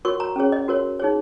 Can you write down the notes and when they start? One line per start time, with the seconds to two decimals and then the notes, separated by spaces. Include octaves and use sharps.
0.05 F#4 A#4 C#5 C#6
0.20 A#5
0.36 C#4 G#4 C#5
0.52 D#5
0.68 F#4 A#4 C#5
1.00 D#4 G#4 C#5